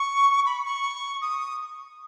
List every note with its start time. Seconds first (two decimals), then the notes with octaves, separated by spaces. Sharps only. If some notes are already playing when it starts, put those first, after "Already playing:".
Already playing: C#6
0.46 B5
0.65 C#6
1.21 D#6